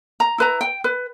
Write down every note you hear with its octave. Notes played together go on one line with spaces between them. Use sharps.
A#5
E4 B4 A#5
G5
B4